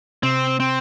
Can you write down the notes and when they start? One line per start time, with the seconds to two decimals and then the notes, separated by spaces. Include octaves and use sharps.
0.23 C3 C4
0.60 C4